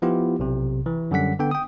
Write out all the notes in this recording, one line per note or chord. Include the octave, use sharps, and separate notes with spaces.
F3 B3 E4 F4 G4
B1 C3
E3
F#2 D3 G3 F#5 B6
D3 B3 G5
G5 D#6